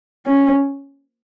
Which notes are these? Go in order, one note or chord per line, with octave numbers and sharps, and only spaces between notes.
C#4